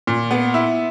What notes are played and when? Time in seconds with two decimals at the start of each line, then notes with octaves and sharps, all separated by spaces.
0.07 A#2
0.31 B3
0.54 E4